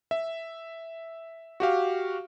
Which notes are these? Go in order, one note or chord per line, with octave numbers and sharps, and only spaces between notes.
E5
F#4 G4 F5